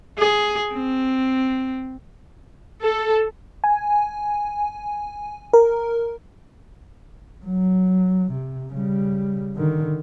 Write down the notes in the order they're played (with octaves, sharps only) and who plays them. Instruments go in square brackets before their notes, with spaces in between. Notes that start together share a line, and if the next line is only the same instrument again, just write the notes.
[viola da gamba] G#4
C4
[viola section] A4
[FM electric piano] G#5
A#4
[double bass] F#3
C3
C#3 G3
D3 D#3